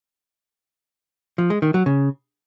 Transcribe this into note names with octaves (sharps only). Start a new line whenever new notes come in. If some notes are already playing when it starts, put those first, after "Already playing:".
F3
G#3
D#3
F#3
C#3